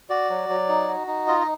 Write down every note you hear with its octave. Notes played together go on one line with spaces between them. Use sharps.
F#4 D5
F#3
F#3
D#4
F#4
D#4
F4 D#5
D#5